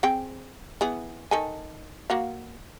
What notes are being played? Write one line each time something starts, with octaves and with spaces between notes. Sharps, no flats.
C4 G#4 G5
E3 B3 G#4
D#3 A4 G#5
A#3 F#4 F5